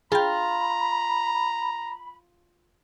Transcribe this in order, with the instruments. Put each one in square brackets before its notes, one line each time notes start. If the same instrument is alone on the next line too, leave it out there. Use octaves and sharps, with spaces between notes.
[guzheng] F4 [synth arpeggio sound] G#4 G5 [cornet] A#5 [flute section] B5